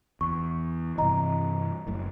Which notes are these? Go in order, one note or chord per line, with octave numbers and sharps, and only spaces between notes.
E2 C#6
G2 C3 E3 D#5 A#5
F#1 F#2 A2